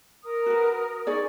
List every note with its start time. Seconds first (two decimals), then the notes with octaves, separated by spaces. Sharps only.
0.23 A#4 D#6
0.46 F#4 B4
1.07 D#4 G#4 D5 C#6